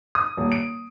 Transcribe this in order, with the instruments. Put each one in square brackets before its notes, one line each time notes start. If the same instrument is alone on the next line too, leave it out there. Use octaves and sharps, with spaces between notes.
[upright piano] D#6
D#1
D7